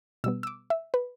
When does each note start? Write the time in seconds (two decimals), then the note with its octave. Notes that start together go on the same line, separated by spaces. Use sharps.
0.24 B2 G3 B3 E6
0.43 E6
0.47 D6
0.70 E5
0.94 B4